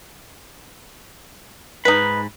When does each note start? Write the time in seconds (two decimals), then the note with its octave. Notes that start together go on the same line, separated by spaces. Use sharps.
1.85 G#2 D#4 B4 B5